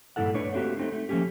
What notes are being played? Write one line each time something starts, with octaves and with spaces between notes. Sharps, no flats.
G2 A#2 E3 E4 A4 F#5
A3 D4 B4 C#5
A3 A#3 C4 F#4 G4
A3 C4 D#4
A3
F3 A3 A#3 C#4 G4